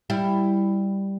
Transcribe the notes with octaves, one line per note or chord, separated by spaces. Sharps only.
G3 E4